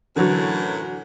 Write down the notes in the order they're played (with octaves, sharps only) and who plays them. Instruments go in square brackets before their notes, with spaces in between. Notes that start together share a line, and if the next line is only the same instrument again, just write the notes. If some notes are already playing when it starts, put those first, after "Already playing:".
[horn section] F#2 A2 F#5 [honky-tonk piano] D3 E3 F#3